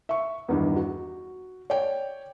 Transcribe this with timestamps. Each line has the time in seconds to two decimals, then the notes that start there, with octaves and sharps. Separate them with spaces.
0.09 E5 C#6
0.49 E2 G2 D#3
0.76 F#4
1.70 C#5 D5 G5